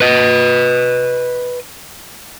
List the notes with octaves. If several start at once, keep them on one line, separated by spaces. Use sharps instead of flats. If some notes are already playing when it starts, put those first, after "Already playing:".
B4 D#5